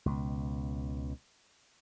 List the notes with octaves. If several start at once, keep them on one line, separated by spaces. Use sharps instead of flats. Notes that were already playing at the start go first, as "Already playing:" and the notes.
C#2 B2